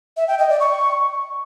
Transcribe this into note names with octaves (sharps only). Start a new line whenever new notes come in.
E5
G5
D#5
D5
C#6